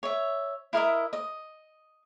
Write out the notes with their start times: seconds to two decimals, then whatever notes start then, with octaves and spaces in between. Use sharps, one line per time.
0.03 C#5 E5
0.73 E4 A#4 D#5 E5
1.13 D#5